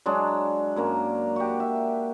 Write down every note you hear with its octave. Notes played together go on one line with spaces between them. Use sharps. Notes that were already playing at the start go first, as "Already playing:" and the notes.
F#3 G#3 D4
F#2 A#3 A#5
F#4 G4
E5